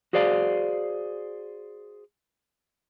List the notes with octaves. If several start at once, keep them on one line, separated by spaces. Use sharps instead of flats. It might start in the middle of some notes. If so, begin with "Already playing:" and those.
F#4 G#4 C5 D5 F5